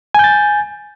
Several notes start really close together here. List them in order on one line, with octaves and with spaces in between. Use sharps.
G#5 G6 A6